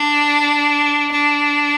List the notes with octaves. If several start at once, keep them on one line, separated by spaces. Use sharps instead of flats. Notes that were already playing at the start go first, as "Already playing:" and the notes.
Already playing: D4
D4